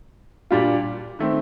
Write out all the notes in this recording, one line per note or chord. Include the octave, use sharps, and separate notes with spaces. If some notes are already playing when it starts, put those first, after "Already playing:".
A#2 G3 D4 F4
D#3 A3 C4